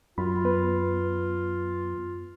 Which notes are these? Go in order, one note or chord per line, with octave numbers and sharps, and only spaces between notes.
F#2 F4 B5
B3 B4